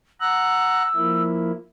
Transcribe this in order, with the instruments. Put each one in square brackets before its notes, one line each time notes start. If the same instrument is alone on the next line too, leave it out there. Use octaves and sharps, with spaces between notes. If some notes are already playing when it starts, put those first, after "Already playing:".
[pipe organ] F#5 A#5 F#6 [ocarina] E6
[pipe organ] F3 A#3 E4